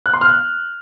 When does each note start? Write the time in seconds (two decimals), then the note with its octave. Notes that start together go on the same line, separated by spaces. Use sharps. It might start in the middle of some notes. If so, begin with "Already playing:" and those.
0.06 F#6
0.13 C6
0.21 F6
0.29 F#6